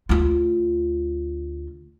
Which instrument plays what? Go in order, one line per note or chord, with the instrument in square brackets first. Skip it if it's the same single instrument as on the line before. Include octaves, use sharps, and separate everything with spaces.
[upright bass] D2 F4